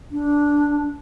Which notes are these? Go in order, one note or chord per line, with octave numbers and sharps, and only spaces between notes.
D4